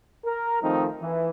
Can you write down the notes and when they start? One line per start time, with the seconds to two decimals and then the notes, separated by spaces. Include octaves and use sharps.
0.25 A#4
0.62 D#3 F3 A3 C4 D#4
1.00 E3